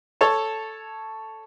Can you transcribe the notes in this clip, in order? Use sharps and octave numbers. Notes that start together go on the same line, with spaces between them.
A4 C#5 A5